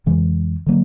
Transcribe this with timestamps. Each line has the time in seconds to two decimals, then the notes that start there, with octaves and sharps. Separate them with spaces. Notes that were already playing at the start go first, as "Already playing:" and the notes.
0.06 F2 C#3 E3 G#3
0.67 D3 F#3 A#3